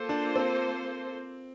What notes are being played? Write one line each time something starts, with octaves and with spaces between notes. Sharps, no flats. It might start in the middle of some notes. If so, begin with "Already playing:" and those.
Already playing: A#3 F4 A4 C5
D4
C4